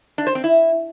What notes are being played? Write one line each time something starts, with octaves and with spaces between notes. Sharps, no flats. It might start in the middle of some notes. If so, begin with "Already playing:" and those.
D4
C5
C4
E4